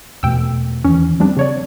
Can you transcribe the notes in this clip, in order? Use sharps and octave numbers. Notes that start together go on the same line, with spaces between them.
E2 B2 A3 G5 E6
E2 D#3 E3 C#4
F3 G3 A#3 C4 D4
C#3 C#5 D5